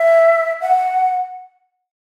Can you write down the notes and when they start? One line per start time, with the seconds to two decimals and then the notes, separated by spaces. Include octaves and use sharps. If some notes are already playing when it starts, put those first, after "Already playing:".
Already playing: E5
0.61 F#5